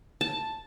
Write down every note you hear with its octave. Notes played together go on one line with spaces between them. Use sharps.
A5